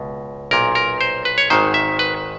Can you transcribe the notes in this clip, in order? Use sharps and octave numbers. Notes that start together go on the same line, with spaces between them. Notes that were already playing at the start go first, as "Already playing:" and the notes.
Already playing: C#2 B2
B1 A#2 A#4
A#4
C5
B4
C#5
G#1 G#2 D#3 C5
E5
B4